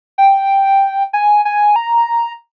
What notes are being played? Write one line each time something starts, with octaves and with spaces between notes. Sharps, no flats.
G5
G#5
G#5
A#5